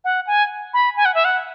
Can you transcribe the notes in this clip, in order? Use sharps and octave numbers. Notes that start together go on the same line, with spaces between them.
F#5
G#5
B5
G#5
F#5
E5
F#5